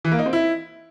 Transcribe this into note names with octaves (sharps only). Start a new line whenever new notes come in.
E3
A#3
D#4
C4
E4